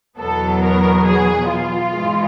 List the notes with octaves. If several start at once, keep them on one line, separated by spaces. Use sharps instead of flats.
E2 B2 F#3 B3 A4
A#4
G#4
F4
G#2 E3 G#3